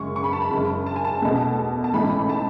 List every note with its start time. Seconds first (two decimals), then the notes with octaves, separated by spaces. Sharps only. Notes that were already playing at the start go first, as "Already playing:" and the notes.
Already playing: F#1 F#2 C#3 G#3 C#6
0.16 C#6
0.24 B5
0.33 A5
0.42 B5
0.51 F#1 F#2 C#3 G#3
0.86 A5
0.96 G#5
1.05 A5
1.22 E2 B2 A3
1.84 A5
1.94 A1 G#2 E3 A3 B5
2.29 A5